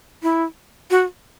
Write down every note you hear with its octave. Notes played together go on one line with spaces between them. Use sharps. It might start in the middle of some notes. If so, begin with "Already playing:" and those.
E4
F#4